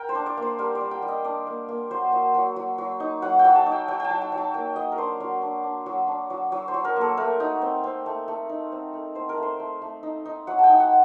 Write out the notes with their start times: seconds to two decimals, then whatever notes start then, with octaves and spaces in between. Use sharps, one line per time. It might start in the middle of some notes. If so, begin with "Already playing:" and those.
Already playing: A#4 G5
0.09 C5
0.15 D4
0.26 D5
0.37 A#3 C5
0.58 G3 A#4
0.75 D5
0.81 G3
0.91 G5
1.02 G3
1.08 D#5
1.24 D4 D5
1.47 A#3
1.68 A#3
1.91 F#3 C5
2.12 F#3
2.34 F#3
2.56 F#3
2.78 F#3
3.00 D#4
3.22 F#3 F#5
3.39 G5
3.44 F#3
3.55 A5
3.66 D#4
3.72 G5
3.88 F#3 G5
4.00 G5 A5
4.10 F#3
4.22 G5
4.32 F#3
4.38 A5
4.54 A#3 G5
4.76 F#3 D#5
4.92 A#4
4.98 D4 C5
5.20 F#3 A#4
5.42 D4
5.64 D4
5.86 F#3
6.08 D4
6.30 F#3
6.52 F#3
6.68 C5
6.74 F#3
6.84 A#4
6.96 A#3 A4
7.17 A3 A#4
7.40 D#4
7.62 C4
7.84 C4
8.06 A3
8.28 A3
8.49 D#4
8.72 C4
8.93 A3
9.15 C4 C5
9.29 A#4
9.37 A3
9.42 C5
9.59 A3
9.82 A3
10.03 D#4
10.25 D#4
10.47 F#3 F#5
10.59 G5 A5
10.70 D#4
10.80 F#5